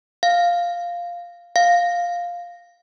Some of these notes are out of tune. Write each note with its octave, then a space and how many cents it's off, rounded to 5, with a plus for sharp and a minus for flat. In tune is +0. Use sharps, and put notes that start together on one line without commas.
F5 +0
F5 +5